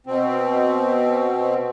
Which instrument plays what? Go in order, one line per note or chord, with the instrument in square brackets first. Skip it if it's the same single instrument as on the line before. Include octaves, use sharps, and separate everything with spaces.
[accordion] B2 C4